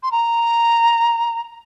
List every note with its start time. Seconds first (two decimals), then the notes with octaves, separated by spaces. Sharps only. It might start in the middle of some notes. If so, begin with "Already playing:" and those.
0.03 C6
0.12 A#5